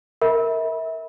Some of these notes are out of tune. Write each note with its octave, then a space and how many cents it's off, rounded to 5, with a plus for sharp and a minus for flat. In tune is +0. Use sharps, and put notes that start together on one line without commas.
A#4 -10 E5 -30 B5 -25